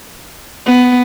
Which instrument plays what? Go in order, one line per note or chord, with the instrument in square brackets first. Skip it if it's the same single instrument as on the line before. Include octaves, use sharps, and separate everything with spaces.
[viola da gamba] B3